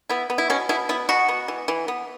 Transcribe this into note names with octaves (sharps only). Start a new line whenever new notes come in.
B3 E4
B3
E4
B2 C#4
B2 E4
B3 E4
B2 F#4
B3
E3
E3
B3